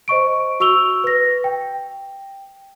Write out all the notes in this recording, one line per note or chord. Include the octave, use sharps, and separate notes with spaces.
C5 D#5 C#6 D7
F#4 C#6 E6 F7 G7
B4 A#6
G5